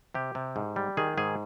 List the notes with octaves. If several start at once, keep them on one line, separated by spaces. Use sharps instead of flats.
C3 G4
C3
G#2
G3
D#3 G#4
G#2 G#4